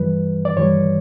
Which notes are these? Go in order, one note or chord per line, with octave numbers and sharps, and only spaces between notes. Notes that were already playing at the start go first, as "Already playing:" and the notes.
Already playing: G2 E3 G3 B4
D5
G2 E3 G3 C#5